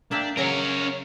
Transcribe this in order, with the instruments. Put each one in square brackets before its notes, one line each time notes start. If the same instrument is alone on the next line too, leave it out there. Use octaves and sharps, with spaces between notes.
[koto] A#3 E5 G5 [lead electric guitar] D4
[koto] C#3 F#3 [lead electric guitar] C#4 [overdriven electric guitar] A#4 C#5